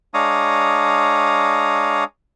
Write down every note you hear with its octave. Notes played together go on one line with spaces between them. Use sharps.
G#3 D4 C#5 F5 A#5 D#6